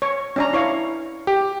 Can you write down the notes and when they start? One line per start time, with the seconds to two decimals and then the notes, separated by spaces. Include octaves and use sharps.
0.02 C#5
0.36 C#4 D4 A#5
0.53 E4 C#5 F5
1.27 G4